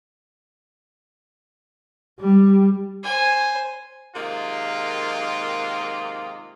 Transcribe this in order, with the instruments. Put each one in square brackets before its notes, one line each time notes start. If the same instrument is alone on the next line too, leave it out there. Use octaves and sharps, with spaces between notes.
[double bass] G3
[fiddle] C5 G#5
[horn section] C3 D#3 G#3 A#3 F4